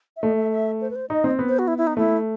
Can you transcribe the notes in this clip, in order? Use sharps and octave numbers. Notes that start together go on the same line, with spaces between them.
E5
A3 D#5
E5
E5
C5
B4
C5
D#4 D#5
C4
B3
C5
F#4
E4
E4
D#4
A3 E4